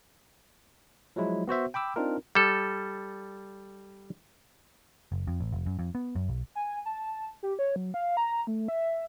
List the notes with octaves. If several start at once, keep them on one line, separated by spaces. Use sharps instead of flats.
F3 F#3 G#3 E4
B3 F#4 C5 E5
G5 B5 D6 E6
C4 D4 D#4 F4 A#4
G3 A4
F#1
F2
A1
F1
F#2
F2
B3
F#2
B1
G#5
A5
G4
C#5
F#3
F5
A#5
A3
E5